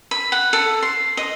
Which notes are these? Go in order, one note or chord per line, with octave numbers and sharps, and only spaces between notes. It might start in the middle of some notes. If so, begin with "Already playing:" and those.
B5
F#5
A4
C6
D#5